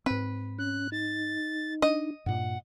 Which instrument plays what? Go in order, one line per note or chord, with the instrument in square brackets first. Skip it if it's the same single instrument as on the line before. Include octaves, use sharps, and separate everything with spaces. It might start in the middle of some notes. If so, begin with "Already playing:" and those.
[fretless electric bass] G#2 C4 [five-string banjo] B4
[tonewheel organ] C#4 [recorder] F#6
[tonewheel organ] D#4 [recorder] A6
[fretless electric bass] D4 [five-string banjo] D#5
[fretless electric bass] G2 A#2 [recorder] F#5